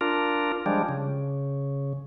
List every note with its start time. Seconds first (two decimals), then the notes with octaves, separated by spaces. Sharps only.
0.01 D4 F4 A#4
0.66 F3 G3 G#3 D4
0.89 C#3